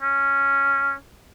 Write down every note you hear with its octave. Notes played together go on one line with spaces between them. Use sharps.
C#4